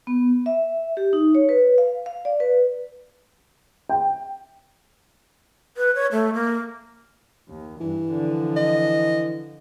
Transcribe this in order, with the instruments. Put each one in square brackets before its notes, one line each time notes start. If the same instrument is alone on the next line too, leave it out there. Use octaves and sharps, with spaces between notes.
[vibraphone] B3
E5
G4
D#4
C#5
B4
F5
F5
D5
B4
[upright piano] G5
[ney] B4
C#5
A3
A#3
[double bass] D#2
[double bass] G2 [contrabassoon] E3
[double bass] D3 F3
[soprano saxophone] D#5